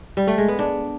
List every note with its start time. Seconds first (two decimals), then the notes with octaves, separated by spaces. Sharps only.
0.17 G3
0.27 A3
0.38 G#3
0.48 B3
0.59 D4